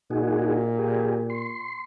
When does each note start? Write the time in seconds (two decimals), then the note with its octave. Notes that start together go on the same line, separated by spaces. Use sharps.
0.11 A#2 D#4 F#4 G#4
0.78 G4 G#4
1.30 C6